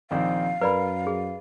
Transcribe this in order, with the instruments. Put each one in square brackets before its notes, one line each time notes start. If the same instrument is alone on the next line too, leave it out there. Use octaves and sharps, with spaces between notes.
[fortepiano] A#1 D#3 C4 [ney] F5
[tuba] F#2 [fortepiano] A#4 [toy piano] B4 D5 B5
[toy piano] G#4